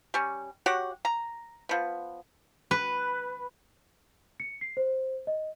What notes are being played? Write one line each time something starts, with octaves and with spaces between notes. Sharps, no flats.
G3 C#4
F#4 G4 C#5 F#5
A#5
F3 B3
B4
C#7
C7
C5
D#5